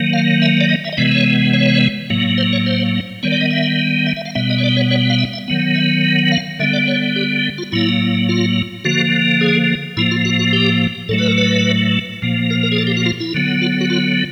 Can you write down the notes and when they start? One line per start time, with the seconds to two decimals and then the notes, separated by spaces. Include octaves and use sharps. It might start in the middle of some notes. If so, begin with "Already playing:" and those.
Already playing: D#3 F#3 A#3
0.13 F5
0.42 E5
0.61 D5
0.69 D#5
0.84 E5
0.93 D#5
0.97 C3 E3 G#3 B3 D5
1.12 C#5
1.53 C#5
2.10 A2 F#3 A#3
2.38 C5
2.53 C#5
2.66 C5
3.23 D#3 G3 B3 C#5
3.32 D5
3.41 D#5
3.51 E5
4.07 E5
4.17 E5
4.25 F5
4.35 B2 G3 B3 E5
4.50 D#5
4.58 C#5
4.64 D5
4.77 C#5
4.91 C#5
5.10 F5
5.19 E5
5.33 E5
5.48 D#3 F#3 B3
5.76 E5
6.32 F5
6.60 D3 G3 B3 E5
6.73 D5
6.88 C#5
7.16 G4
7.58 F4
7.72 A2 F#3 A#3 E4
8.29 F4
8.85 D3 F3 A#3 F#4
9.41 G#4
9.97 A2 F3 A#3 E4
10.11 F4
10.25 F#4
10.39 F#4
10.53 G4
11.09 A2 F#3 A3 A4
11.18 B4
11.27 A#4
11.38 B4
12.22 A#2 F3 A#3
12.50 A#4
12.63 A#4
12.72 G#4
12.78 A4
12.87 G4
12.97 F#4
13.06 F4
13.20 E4
13.34 D3 F#3 B3
13.62 F4
13.81 F#4
13.90 F4